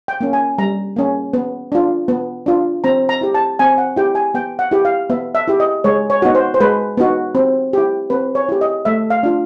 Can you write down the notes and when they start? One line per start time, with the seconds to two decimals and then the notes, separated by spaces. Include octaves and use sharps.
0.08 G5
0.21 A#3 C#4
0.33 G#5
0.58 G3 A#5
0.96 A#3 C#4
1.33 B3
1.72 D4 F4
2.08 B3
2.46 D4 F4
2.84 C4 A#5
3.09 A#5
3.21 E4 G4
3.34 A5
3.59 C4 G#5
3.78 F#5
3.96 E4 G4 G5
4.15 G#5
4.34 B3 G5
4.59 F#5
4.71 E4 G4
4.85 F5
5.10 B3 E5
5.35 E5
5.48 E4 G4
5.60 D#5
5.84 G#3 C#5
6.10 C#5
6.22 B3 D#4 F#4
6.35 C5
6.54 C5
6.60 G#3 B4
6.97 B3 D#4 F#4
7.35 C4
7.73 E4 G4
8.10 C4 B4
8.35 C#5
8.49 E4 G4
8.61 D#5
8.85 A3 E5
9.10 F5
9.23 D4 F4